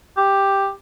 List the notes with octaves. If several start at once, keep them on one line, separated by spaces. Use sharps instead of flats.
G4